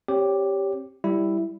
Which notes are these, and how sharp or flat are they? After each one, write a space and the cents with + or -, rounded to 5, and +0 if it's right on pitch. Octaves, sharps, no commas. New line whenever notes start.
C4 +35 G4 +0 C#5 +25
G3 +0 E4 +0